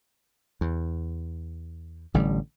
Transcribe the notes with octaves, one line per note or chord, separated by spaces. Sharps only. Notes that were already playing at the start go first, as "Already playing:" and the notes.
E2
A1 D3 G3